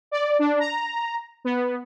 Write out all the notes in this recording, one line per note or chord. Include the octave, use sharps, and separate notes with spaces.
D5
D4
A#5
B3